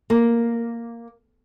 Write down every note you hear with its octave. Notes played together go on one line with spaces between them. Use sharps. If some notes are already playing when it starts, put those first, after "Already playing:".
A#3